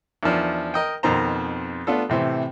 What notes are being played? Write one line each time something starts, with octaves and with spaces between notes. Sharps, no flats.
E2 D#3 F3 D4
A#4 D#5 G5
F2 B2 D#3 C4 C5 A#5
A3 B3 D4 F4 A4
A2 C3 E3 C5